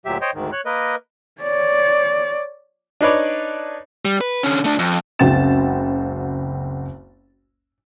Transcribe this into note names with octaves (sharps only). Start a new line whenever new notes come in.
D2 A#2 F#3 G4 E5
C5 C#5 D#5 G5
D2 G#2 D#3
C#5 F#6
A#3 A#4 B4 D#5
C#5 D5
D4 D#4 B4 C#5 D5
G3
B4
D3 C#4
A3 D4
F2
F#1 C#2 C4 F#4 A6 E7